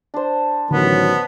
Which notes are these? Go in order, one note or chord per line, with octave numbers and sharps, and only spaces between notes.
D4 C5
A1 D3 D#3 F#3 B3